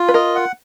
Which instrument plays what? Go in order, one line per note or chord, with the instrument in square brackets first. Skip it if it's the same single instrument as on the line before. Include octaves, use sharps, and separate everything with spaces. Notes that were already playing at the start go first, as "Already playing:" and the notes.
Already playing: [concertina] F4
[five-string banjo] B4
[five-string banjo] A#4 [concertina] D#5
[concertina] F#5